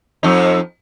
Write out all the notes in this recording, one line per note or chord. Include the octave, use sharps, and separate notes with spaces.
F2 D#4